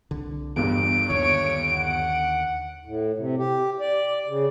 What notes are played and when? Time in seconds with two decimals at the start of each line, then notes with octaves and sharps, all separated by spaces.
0.11 C2 D3
0.56 G1 E2 G2 E3 B3 D7
1.10 D#2 D3 D#3 C#5
1.72 F#5
2.85 A2
3.18 C3
3.38 G4
3.80 D5
4.27 C#3